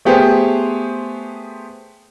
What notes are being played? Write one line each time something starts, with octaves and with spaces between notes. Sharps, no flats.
A3 B3 G4 G#4 C5